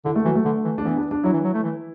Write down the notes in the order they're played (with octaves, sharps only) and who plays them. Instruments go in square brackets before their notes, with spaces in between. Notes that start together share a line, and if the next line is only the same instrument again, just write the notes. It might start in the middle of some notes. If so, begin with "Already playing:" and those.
[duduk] D3 [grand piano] E4
[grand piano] A3
[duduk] E3 [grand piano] F#3
[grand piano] A3
[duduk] D3
E3
[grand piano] D4
[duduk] E3 [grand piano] B3
[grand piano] D4
D4
[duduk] F#3 [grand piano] E4
[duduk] E3
F#3
A3
E3